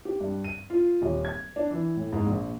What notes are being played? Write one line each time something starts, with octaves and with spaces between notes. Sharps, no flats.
G4
G2
D#7
F4
D#1
G#6
D4
E3
A2
G#2
A#1